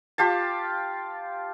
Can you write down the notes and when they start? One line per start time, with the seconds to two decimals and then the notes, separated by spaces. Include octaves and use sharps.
0.18 F4 G4 F5 A5